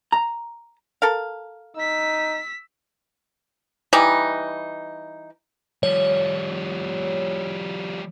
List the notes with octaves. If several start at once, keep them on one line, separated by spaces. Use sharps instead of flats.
A#5
A4 A#4 F5
D#4 E6 B6
E3 G3 D#4
F3 G3 C#5